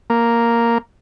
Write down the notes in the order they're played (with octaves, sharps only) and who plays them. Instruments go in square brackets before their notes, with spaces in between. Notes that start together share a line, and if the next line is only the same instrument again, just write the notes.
[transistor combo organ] A#3